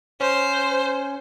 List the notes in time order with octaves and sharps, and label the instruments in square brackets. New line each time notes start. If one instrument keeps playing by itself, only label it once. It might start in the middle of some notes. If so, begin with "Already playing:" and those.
[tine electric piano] C#4 [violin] C5